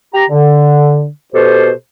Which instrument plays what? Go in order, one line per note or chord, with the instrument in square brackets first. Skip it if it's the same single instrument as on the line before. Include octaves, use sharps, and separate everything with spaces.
[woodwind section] G4 A#5
D3
B2 G4 A4 C5